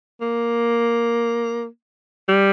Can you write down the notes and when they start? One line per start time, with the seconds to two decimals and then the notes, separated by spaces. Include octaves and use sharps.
0.21 A#3
2.29 G3